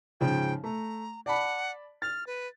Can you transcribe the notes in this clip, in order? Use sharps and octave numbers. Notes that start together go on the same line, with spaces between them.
G#2 C#3 F3 G5
A3 A#5
D5 F#5 A5 B5
F6 A6
B4